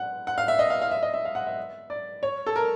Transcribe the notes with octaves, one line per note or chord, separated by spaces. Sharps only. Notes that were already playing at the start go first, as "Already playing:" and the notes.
Already playing: F#5
F#5
F5
E5
D#5
F5
F5
E5
D#5
E5
F5
F#5
E5
D5
C#5
A4
A#4